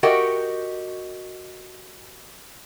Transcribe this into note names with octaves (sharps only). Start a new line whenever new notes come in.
F#4 G4 A#4 D#5 F#5 G5